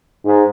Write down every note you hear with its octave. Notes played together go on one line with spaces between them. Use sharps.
G#2